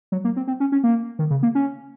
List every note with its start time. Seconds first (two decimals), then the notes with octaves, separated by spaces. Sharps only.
0.12 F#3
0.25 A#3
0.36 C4
0.47 C4
0.60 C#4
0.72 C#4
0.84 A#3
1.19 D#3
1.30 C#3
1.43 A#3
1.55 C#4